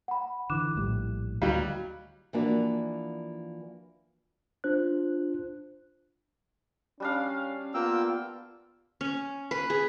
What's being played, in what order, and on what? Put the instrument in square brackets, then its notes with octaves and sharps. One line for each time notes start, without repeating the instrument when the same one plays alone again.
[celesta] F#5 B5
[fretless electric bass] D3 E3 [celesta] D6 F#6 E7
[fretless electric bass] A#1 A2 G3
[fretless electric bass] D2 [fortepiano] F#3 G3 [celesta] D#5 F5
[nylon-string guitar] E3 F3 A#3 D4 F#4
[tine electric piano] D4 F4 C5 F#6
[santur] G3 D4 F5 [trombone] C#4
[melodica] A#3 G5 E6 [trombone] B3 [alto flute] F4
[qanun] C#4
B4
G#4